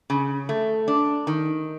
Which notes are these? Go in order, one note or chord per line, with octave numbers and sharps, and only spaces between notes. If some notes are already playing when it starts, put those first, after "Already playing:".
C#3
A3
D4
D#3